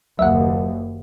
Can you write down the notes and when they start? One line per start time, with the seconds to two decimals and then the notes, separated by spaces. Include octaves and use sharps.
0.19 F#1 D#2 F#3 E5 F#5